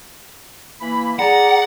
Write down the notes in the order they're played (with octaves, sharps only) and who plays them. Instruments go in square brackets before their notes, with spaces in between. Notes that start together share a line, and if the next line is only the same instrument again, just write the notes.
[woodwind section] E3 A#3 B5
[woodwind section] G#4 D5 A#5 [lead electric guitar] F#5